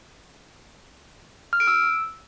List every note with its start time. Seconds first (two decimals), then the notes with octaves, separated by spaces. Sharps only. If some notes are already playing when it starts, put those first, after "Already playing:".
1.53 F6
1.60 D7
1.67 E6